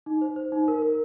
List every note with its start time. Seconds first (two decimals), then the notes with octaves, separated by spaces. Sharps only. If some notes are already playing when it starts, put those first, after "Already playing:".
0.06 D#4
0.21 C5
0.36 C5
0.52 D#4
0.68 A#4
0.82 A#4